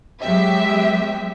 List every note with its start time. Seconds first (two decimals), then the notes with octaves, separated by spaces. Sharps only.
0.21 F#3 G#3 B3 G4 E5